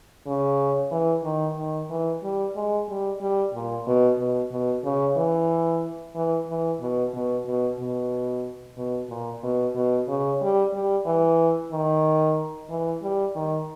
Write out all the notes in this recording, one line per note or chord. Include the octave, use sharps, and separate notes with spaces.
C#3
E3
D#3
D#3
E3
G3
G#3
G3
G3
A#2
B2
B2
B2
C#3
E3
E3
E3
B2
B2
B2
B2
B2
A#2
B2
B2
C#3
G3
G3
E3
D#3
E3
G3
D#3